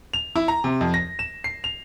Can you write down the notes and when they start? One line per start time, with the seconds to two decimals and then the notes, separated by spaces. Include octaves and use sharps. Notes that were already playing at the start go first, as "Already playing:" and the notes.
0.13 F7
0.36 E4
0.48 A#5
0.64 C3
0.81 F2
0.94 A#6
1.19 E7
1.44 C7
1.64 F7